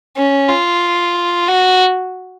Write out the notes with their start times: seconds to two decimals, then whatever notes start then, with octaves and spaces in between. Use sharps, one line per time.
0.17 C#4
0.49 F4
1.48 F#4